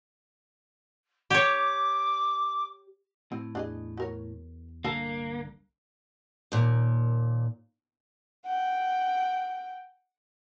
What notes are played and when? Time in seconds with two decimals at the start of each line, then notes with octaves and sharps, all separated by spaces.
1.30 G4 C#5 D6
3.32 A2 C4
3.55 E2 D4 G#4 D#5
3.97 F#4 A#4 C#5
4.85 C2 G2 D3 A#3 A4 A#4 A5
6.52 D#2 A#2
8.45 F#5 G5